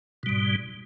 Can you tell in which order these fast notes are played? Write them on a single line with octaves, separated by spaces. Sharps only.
B2 G3 G#2